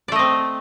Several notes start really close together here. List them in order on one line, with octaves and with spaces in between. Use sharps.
D5 A3 D#5 C4